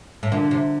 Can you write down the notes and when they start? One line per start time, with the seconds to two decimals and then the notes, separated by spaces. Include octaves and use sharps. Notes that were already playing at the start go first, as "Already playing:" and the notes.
0.23 A2
0.32 A#2 D3
0.51 C3